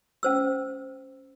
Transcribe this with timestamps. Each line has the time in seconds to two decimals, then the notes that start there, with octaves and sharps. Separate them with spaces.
0.23 C#4 C5 E6